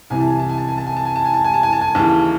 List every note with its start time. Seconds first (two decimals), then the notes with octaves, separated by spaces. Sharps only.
0.10 C2 C3 E3 G#5
0.20 A5
0.30 G#5
0.39 A5
0.49 G#5
0.58 A5
0.67 G#5
0.78 A5
0.87 G#5
0.96 A5
1.05 G#5
1.16 A5
1.25 G#5
1.34 A5
1.44 G#5
1.54 A5
1.63 G#5
1.73 A5
1.81 G#5
1.95 D#2 C#3 E3 A5